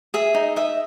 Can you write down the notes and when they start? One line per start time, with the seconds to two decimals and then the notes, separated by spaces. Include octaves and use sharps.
0.14 G#4 E5
0.34 D#4
0.56 D#5 E5